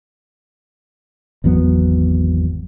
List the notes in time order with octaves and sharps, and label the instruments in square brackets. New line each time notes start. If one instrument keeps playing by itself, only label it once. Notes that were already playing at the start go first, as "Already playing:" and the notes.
[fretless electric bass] G#1 E2 F#3 B3